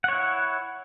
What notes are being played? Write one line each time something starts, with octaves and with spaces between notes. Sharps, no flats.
E4 C#5 F#5